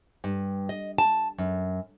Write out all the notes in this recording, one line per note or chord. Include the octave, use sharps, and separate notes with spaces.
G2
D#5
A5
F#2